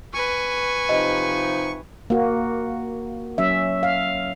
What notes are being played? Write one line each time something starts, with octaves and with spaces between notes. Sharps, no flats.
B4 G#5 C#6
C3 F3 D#4 D#5
A#3 F#4
F#3 C#4 E5
F5